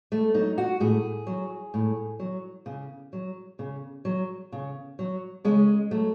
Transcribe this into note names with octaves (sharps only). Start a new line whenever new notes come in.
A3
F#3 D#4
F#4
A2 G#4
F#3
A2
F#3
C#3
F#3
C#3
F#3
C#3
F#3
C#3 G#3
F#3 A3